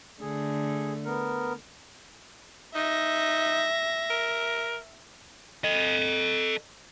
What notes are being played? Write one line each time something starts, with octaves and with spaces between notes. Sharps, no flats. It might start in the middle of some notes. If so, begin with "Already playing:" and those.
D3 A3 G#4
B3 A#4
D#4 E5 A#6
A#4
A4 D#5